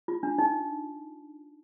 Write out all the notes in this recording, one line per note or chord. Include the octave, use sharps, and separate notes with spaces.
F4
D4
D#4